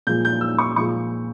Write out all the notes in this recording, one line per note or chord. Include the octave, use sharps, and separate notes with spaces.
A#2 F3 G#3 G6
G6
E6
C#6
A#2 F3 G#3 C#6